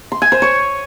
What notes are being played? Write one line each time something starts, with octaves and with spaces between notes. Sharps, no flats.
C6
G#5
C5
C#5